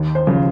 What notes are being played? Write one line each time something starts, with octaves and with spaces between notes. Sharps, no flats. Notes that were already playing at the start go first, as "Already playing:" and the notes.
Already playing: D#2
C5
C#3 F3